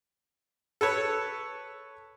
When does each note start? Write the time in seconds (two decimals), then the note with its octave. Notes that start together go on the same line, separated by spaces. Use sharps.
0.81 A4 B4 C#5